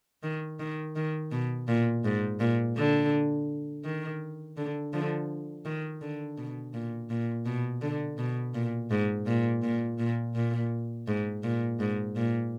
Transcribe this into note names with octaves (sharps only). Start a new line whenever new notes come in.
D#3
D#3
D#3
B2
A#2
G#2
A#2
D3
D#3
D3
D3 F3
D#3
D3
B2
A#2
A#2
B2
D3
B2
A#2
G#2
A#2
A#2
A#2
A#2
G#2
A#2
G#2
A#2